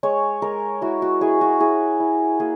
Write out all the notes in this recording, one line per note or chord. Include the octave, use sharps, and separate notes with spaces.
G#3 C#5
G#3 A#4
E4 F#4
F#4
E4 G#4
F#4
E4 G#4
E4
A#3 G#4